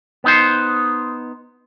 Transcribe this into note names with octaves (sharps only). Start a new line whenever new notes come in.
B3 D#4 C5